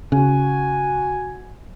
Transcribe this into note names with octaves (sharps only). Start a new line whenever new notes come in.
C#3 F#4 G#5